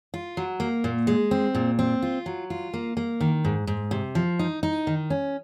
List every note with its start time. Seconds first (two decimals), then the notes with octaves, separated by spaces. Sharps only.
0.14 F4
0.37 F#3
0.60 A#3
0.84 A#2
1.07 G#3
1.31 C4
1.55 A#2
1.79 C4
2.02 F4
2.26 F#3
2.50 F4
2.74 A#3
2.97 A#3
3.20 D#3
3.44 G#2
3.67 G#2
3.91 C3
4.15 F3
4.39 D#4
4.63 D#4
4.87 D#3
5.10 C#4